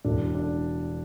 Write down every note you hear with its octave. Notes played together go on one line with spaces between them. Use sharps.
E1 D4
D4